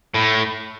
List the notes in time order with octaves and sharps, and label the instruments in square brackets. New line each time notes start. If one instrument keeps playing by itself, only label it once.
[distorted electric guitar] A2